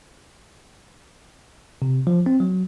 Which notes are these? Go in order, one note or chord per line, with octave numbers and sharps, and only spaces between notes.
C3
F3
C4
F#3